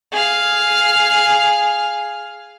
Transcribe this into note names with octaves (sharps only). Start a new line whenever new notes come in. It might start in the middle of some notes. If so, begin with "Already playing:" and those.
G#4 F5